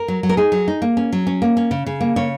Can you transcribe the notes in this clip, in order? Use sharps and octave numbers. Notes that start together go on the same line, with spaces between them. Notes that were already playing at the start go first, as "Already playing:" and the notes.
Already playing: A#4
F#3
F#3
A#4
D#4 G#4
F#3
D#4
A#3
C#4
F#3
C#4
A#3
C#4
C#3
C#3
A#3
C#3 C#5